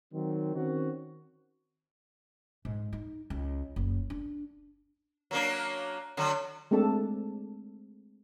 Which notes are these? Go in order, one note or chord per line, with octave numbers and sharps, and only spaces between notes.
D#3 F#3 C4
D#3 C4 C#4 F#4
G#2
D#4
C#2
F#1
D4
F#3 A#3 D4
D3 F#3
G#3 A3 C4 D4 A4 A5